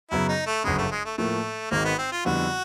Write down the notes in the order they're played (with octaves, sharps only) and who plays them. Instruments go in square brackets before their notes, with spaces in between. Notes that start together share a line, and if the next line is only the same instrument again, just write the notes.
[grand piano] F#2 C#3 F#3 B3 [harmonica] E4
[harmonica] D#4
A3
[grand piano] G1 F#2 C#3 [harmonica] G#3
[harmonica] A3
G#3
A3
[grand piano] A2 F3 A#3 [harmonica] A3
[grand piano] G#1 G#2 D#3 G#3 [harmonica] A#3
[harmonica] B3
C4
F4
[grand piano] F2 D3 G3 B3 E4 [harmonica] F#4